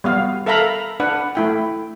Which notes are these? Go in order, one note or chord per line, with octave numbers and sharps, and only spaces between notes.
G3 B3 F5
A4 A#4 E5 F5 A#5 B5
D4 B4 F#5
A3 E4 G5